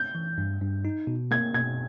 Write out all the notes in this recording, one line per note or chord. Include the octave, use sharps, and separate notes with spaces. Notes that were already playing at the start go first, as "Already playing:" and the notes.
Already playing: G6
E3
G2
G2
D#4
B2
A#3 G#6
B2 G#6